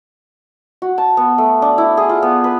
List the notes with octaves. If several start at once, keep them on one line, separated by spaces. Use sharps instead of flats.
F#4
A5
B3
A3
D4
E4
G#4
F4
B3
B4